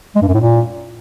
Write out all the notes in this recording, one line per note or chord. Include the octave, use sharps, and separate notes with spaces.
G#3
G2
F#2
A2
A#2